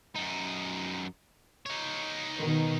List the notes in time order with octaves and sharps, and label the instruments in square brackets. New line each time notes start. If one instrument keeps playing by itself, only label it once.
[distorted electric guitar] F#2 D#4
D#4 C#5
[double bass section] B2 D#3